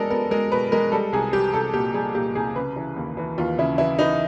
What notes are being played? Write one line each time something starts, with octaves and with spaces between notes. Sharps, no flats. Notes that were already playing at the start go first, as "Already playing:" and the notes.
Already playing: G#3 B3 D4 A4 A#4 D5
B3 A#4
G#3 A#4
B2 B4
G#3 A#4
G3 A4
C2 G#4
G3 G4
C2 A4
A#2 G4
G3 G#4
A#2 G4
C2 G#4
C#3 B4
E3
D#2
E3
D#2 F4
C#3 E4
E3 E4
E3 D#4